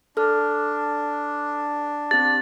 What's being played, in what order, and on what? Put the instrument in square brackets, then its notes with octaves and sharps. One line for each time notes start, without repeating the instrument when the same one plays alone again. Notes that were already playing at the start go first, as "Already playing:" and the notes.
[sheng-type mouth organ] D4 [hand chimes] A4 F6
[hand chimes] C4 G4 [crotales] A6